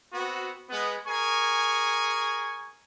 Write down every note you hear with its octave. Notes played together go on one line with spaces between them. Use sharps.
B3 C4 F#4
G#3 B3
G#4 A#4 G#5 C#6